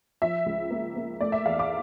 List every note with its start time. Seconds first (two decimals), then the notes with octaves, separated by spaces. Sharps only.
0.22 F3 E5
0.46 C#2
0.71 A#3
0.96 A#3
1.21 A3 D5
1.32 E5
1.46 E2 F5
1.59 D6